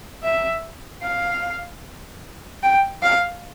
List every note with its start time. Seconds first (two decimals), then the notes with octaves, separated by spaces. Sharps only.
0.23 E5
1.02 F5
2.63 G5
3.03 F5